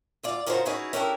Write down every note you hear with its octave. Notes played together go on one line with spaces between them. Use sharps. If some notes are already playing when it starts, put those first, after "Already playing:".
D2 F4 D5
G#2 C#3 F3 F#4 A#4 C5
C#4 D#4 E4 F#4 G#4 B4
C#4 D4 E4 G4 A4 A#4